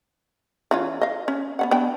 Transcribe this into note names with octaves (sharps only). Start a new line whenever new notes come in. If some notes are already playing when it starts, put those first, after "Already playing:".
E3 C#4 F4
D#5 F5
C#4
B3 C#4 F#5
B3 D4 G5